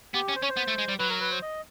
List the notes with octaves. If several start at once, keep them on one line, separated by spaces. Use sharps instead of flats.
B3 G4
C#4
C5
C#4 C#5
C5
B3
A3
G#3
G3
F#3 B4
A#4
B4
C5
D#5